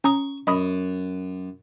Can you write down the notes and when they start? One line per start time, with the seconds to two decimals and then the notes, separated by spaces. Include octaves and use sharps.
0.04 C#4 A#5 C#6 D#6
0.47 F#2 D#5 B5 D#6